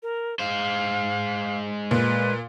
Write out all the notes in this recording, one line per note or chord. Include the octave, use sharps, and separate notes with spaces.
A#4
G#3 C5 F5
A#2 B4